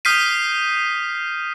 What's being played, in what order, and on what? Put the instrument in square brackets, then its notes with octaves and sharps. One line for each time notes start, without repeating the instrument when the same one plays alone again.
[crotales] D#6 F6 G6 B6 C7 D#7